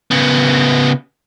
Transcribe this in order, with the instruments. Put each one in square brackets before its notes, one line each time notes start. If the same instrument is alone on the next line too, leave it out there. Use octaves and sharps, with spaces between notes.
[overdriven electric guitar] C#3 B3